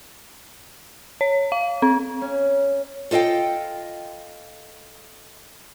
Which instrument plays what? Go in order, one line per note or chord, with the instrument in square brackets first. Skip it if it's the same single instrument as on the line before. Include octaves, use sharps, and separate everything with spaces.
[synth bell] C#5
F5
C4
[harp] C#4
[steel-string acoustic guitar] F4 A4 D#5 F5 G5